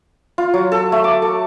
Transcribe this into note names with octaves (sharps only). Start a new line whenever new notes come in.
F4
F#3
A4
A3
D6
A4